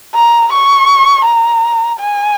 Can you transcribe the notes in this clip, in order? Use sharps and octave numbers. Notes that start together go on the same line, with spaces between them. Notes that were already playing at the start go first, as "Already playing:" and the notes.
A#5
C#6
A#5
G#5